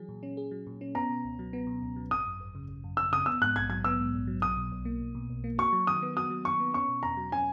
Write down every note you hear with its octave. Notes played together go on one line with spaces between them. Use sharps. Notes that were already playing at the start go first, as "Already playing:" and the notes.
Already playing: E3 F#3 G#4
A#2
C#4
G#4
F#3
A#2
C#4
B3 A#5
B2
C#2
F#3
B3
B2
C#2
F#3
G#1 D#6
F#2
G#1
C#3
G#1
F#2
G#1 E6
C#3 D#6
B3 E6
G#2 F#6
A#1 G#6
F#3 G#6
B3 E6
G#2
A#1
F#3
B1 D#6
B2
B1
A#3
B1
B2
B1
A#3
F#4 C#6
F#3
D#3 D#6
B3
F#4 D#6
F#3
D#3 C#6
B3
C#4 C#6
B2
E2 A#5
F#3
C#4 G#5